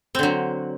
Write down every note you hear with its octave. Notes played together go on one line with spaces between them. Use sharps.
D3 F#3 C4